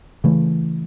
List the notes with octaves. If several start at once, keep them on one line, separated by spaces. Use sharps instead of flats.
C#3 E3 A3